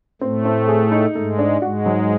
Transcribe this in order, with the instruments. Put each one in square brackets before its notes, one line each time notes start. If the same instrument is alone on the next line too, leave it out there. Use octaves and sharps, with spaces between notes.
[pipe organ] A2 A3 [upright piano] C4
[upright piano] C4
G#4
D#4
[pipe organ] G#2 G#3 [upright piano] A3
[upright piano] D4
[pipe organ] G#2 G#3 [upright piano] F#4
[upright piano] F#3